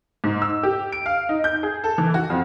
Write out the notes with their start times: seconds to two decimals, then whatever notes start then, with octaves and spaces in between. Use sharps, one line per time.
0.24 G#2
0.42 E6
0.63 G4
0.92 D7
1.06 F5
1.29 D#4
1.44 G6
1.63 G#4
1.84 A4
1.98 E3
2.14 F#4
2.30 F2